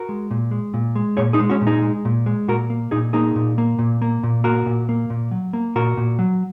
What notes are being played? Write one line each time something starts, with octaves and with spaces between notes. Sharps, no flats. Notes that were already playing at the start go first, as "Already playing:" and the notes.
Already playing: F#4 A#4
G#3
A#2
G#3
A#2
G#3
A#2 G#4 C#5
D#4 G#4
G#3
C#4 F#4
A#2
D#4 G#4
G#3
A#2
G#3
A#2 F#4 A#4
A#3
A#2 D#4 G#4
A#3 D#4 G#4
A#2
A#3
A#2
A#3
A#2
A#3 F#4 A#4
A#2
A#3
A#2
F#3
A#3
A#2 F#4 A#4
A#2
F#3